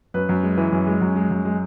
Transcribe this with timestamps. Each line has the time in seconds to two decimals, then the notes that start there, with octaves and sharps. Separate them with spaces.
0.14 F#2 B4
0.29 F#2
0.43 G#3
0.58 E3
0.72 F#2
0.87 G#3
1.01 F#2
1.16 G#3
1.31 F#2
1.45 G#3